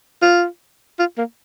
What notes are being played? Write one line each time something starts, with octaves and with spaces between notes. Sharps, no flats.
F4
F4
A#3